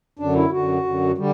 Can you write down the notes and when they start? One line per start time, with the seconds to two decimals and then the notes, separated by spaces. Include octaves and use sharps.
0.19 F#2 D3 D4
0.36 E4
0.52 F#2 D3 F#4
0.85 F#2 D3
1.18 D3 G3